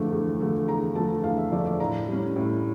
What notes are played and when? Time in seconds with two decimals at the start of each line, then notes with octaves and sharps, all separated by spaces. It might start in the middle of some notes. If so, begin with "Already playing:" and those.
Already playing: E2 D3 F3 A3
0.12 E2
0.40 D3 F3 A3
0.67 E2 A#5
0.95 D3 F3 A3 A5
1.23 E2 F5
1.37 E5
1.51 D3 F3 A3 D5
1.65 D5
1.80 A2 A#5
2.08 G3 C#4
2.36 A2